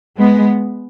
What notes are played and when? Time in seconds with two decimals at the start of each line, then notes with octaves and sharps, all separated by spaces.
0.18 G#3 B3